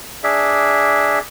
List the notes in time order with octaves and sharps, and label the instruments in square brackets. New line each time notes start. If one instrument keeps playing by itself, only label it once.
[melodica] D4 G#4 D5 E5